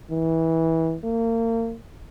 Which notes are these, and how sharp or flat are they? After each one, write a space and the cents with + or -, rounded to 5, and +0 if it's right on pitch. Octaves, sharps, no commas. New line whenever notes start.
E3 -20
A#3 -35